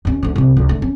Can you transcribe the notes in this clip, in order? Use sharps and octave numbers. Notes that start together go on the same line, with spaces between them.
D#2 C#4
D2 D3
C2 C3
C#2
D3 A3
C#4